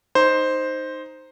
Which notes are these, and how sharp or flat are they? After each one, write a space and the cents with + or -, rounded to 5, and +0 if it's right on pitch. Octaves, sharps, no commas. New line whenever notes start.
D#4 +0 C5 +0